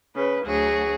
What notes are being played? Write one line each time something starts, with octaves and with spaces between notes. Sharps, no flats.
C#3 B4
D2 F#3 F#4 G#4